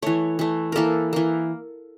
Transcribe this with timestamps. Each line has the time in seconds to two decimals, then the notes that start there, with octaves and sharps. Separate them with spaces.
0.02 E3 A3 C#5
0.39 E3 A3
0.72 E3 A#3 A4 A#4
1.13 E3 A#3